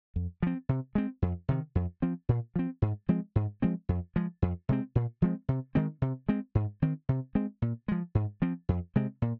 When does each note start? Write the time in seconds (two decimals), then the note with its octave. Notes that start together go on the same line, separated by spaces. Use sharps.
0.16 F2
0.43 F3 C4
0.69 C3
0.95 G#3 C4
1.22 F2
1.49 C3 D#3
1.75 F2
2.02 F3 C4
2.29 A#2
2.56 F3 C4
2.82 G#2
3.09 F3 G#3 C4
3.36 G#2
3.62 F3 G#3 C4
3.89 F2
4.16 F3 G#3
4.42 F2
4.69 C3 G#3 C4
4.95 A#2
5.22 F3 G#3 C4
5.49 C3
5.75 D#3 G#3 C4
6.02 C3
6.29 G#3 C4
6.55 G#2
6.82 D#3 C4
7.09 C3
7.35 G#3 C4
7.62 A#2
7.88 F3 G#3
8.15 G#2
8.42 F3 C4
8.69 F2
8.96 C3 G#3 C4
9.22 A#2